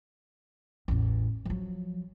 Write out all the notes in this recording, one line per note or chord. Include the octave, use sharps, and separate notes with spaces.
A1 E2
F3 F#3